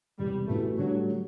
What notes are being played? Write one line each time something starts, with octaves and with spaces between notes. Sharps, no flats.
E1 E2 C3 G3
A1 A2 E3 A3 B3 F#4
A2 F#3 G3 D4 F#4 A4
F#3